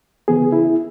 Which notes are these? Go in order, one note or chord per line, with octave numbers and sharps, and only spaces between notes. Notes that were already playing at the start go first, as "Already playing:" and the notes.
C#3 E3 B3 G#4
E4